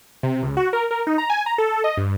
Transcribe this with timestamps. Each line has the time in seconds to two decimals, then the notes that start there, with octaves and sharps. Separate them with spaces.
0.23 C3
0.42 C#2
0.57 F#4
0.73 A#4
0.91 A#4
1.07 D#4
1.18 A#5
1.30 G#5
1.46 A#5
1.58 A4
1.84 D#5
1.97 G2